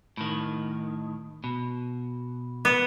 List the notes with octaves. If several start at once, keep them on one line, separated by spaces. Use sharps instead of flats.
A2 D#3
B2
B3